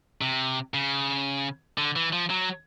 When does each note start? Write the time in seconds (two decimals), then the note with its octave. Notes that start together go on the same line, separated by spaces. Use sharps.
0.21 C3
0.74 C#3
1.78 D3
1.96 E3
2.12 F3
2.30 F#3